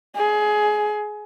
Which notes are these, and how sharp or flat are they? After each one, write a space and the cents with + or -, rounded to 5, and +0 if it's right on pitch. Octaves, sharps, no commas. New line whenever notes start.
G#4 +20